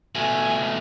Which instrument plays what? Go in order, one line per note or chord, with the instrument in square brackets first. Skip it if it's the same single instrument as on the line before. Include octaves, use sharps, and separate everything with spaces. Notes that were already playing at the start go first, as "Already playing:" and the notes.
[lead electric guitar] B2 A3 [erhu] G#5